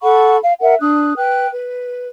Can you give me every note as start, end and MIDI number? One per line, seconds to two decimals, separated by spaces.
0.02 0.36 69
0.02 0.36 78
0.02 0.36 83
0.02 0.36 85
0.41 0.52 77
0.59 0.74 70
0.59 0.74 76
0.59 0.74 78
0.80 1.14 62
0.80 1.14 87
0.80 1.14 90
1.16 1.46 71
1.16 1.46 79
1.16 1.46 90
1.51 2.07 71